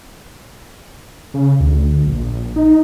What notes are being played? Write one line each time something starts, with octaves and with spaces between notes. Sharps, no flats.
C#3
D2
A#1
D#4